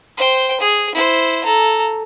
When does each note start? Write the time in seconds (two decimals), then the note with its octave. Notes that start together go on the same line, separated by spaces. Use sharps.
0.18 C5 G5
0.60 G#4
0.95 E4 C5
1.44 A4 A#5